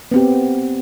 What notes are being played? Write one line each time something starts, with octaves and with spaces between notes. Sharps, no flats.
B3 C4 G4